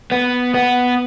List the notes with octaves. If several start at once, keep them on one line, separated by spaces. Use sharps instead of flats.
B3
B3